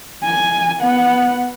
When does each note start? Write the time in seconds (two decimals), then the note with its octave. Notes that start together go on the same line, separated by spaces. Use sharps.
0.24 G#5
0.80 B3 F#5